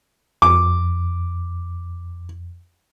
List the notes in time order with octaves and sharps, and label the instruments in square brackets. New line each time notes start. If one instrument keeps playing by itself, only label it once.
[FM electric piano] F2 [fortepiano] D6